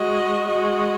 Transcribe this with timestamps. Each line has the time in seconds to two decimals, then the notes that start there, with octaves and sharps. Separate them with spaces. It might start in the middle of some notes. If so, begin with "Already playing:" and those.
Already playing: G#3 F#4 D#5
0.48 G#3 F#4 D#5